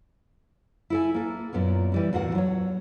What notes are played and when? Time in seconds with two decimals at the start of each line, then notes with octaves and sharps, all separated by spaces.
0.90 E4 A4 G#5
1.14 A#3 A4
1.53 F#2 A#2 B3 A#4
1.92 E3 G3 E4
2.13 E2 A2 F#4 A#4 F#5
2.35 F#3 C#5